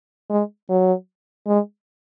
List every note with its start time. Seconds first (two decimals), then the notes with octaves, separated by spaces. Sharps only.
0.30 G#3
0.70 F#3
1.47 G#3